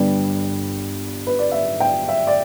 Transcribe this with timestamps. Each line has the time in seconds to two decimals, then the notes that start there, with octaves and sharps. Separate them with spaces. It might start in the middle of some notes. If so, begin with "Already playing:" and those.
Already playing: G1 G2 G3 D4 B4
1.27 B4
1.39 D5
1.52 E5
1.80 G5
2.09 E5
2.27 D5